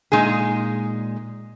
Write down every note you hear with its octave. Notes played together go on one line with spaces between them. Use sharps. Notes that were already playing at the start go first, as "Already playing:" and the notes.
A#2 G#3 D#4 G#4